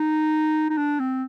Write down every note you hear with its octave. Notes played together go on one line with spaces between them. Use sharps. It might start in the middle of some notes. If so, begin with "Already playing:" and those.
Already playing: D#4
D#4
D4
C4